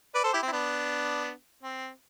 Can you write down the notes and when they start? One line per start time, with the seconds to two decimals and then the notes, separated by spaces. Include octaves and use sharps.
0.15 B4 D5
0.24 A4 C5
0.33 E4 G4
0.43 C4
0.48 E4
0.52 B3 D4
1.63 C4